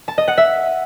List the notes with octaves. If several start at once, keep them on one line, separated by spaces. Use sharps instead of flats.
A5
D#5
F#5
E5